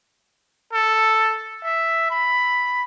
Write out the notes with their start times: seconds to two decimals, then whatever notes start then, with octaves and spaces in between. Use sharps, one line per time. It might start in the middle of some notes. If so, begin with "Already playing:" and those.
0.73 A4
1.64 E5
2.11 B5